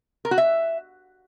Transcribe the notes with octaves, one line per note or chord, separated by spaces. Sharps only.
A#4
F#4
E5